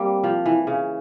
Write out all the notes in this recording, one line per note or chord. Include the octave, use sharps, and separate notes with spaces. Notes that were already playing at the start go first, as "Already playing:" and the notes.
Already playing: G3 A#3 C4
F3
E3
C#3